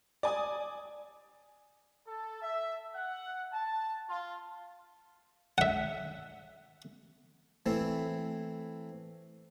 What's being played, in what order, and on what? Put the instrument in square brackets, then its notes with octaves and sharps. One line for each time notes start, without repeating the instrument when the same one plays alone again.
[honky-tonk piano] D5 G#5 D#6
[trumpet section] A4
E5
F#5
A5
F4
[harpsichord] E5 F#5
E3 A3 C4 E4